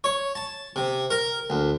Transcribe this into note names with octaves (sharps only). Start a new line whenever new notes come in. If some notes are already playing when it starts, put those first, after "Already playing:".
C#5
A5
C3
A#4
D2